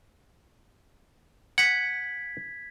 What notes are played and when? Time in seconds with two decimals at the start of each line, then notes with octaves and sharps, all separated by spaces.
1.58 F#5 G#6 B6